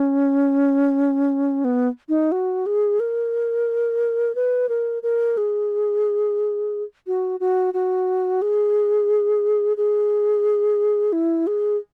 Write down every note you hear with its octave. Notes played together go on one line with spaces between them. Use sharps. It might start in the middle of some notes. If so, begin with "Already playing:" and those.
Already playing: C#4
B3
D#4
F#4
G#4
A#4
B4
A#4
A#4
G#4
F#4
F#4
F#4
G#4
G#4
E4
G#4